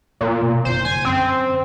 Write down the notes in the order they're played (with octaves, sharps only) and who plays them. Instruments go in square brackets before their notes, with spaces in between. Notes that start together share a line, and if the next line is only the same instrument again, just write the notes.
[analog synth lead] A#2 [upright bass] A#3 B3
[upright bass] B2
[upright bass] F#1 D#4 [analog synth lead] C5
[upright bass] D2 C#3 [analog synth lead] G#5
[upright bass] F#2 D3 [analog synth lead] C4